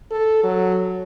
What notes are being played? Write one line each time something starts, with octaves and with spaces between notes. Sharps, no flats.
A4
F#3